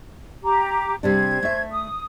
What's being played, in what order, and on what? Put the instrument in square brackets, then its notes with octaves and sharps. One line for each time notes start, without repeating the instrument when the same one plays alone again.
[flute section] G4 A#5 D6
[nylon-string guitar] C3 G3 D4 [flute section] C5 G#6
[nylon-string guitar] A3 E5
[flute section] D#6